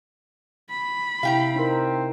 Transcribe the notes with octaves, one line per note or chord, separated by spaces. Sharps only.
B5
C3 E4 F5 G5 A#5
C4 D#4 A#4